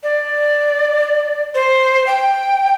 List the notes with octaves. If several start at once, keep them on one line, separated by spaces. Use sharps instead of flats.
D5
C5
G5